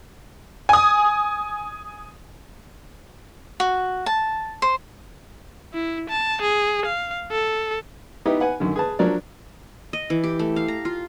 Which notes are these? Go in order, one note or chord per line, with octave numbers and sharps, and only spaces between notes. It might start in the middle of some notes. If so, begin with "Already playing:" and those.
G#5 D#6
F#4
A5
C5
E4
A5
G#4
F5
A4
B3 D#4 E4 G4
B4 F#5 G#5
F#2 D3 D#3
G#4 B4 A5
F3 F#3 D4 A#4 D5
D#5
E3
G4
A3
F5
A#5
F4